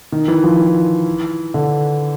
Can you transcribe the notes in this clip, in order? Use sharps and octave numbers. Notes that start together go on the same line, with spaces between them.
D#3
E3
F3
E3
D3